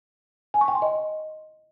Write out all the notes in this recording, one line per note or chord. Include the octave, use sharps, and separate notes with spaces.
G#5
C#6
G5
C6
D#5